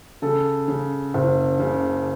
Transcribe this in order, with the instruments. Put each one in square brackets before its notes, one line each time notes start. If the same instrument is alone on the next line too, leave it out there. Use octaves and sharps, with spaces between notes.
[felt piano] C#3 A4
C#3
F#1
C#3